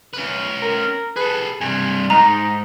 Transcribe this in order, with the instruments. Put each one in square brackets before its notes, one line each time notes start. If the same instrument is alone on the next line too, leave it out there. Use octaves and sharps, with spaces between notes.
[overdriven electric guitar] C#4 B4
[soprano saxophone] A#4
[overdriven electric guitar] G#4 A4 [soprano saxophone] B4
[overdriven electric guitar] G2 C3 [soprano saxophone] G#5
[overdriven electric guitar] G#2 [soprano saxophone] D#4 [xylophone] A#5